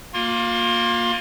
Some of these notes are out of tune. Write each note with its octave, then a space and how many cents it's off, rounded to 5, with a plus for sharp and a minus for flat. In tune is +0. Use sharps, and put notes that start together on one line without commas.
A#3 +0 F4 +35 C6 +30